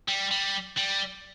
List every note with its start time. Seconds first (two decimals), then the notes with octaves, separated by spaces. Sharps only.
0.08 G3
0.31 G3
0.77 G3